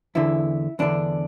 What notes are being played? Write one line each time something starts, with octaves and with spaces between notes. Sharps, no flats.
E2 D3 E4
E2 D3 D4